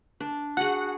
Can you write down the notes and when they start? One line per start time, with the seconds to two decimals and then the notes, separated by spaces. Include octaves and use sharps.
0.20 D4
0.57 F#4 G#4 F#5